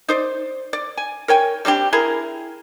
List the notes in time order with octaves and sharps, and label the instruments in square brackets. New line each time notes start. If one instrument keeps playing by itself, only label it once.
[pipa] D#4 C5 D5
D5
G#5
A#4 C#5 G5 G#5
G3 C4 D4 G4
E4 G#4 A#4